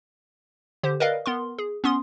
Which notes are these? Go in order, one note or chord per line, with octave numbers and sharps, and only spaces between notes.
D3 G4 C5
A#4 B4 D5 D#5 F5
B3 A#4 C6
G#4
B3 C#4 C6 D#6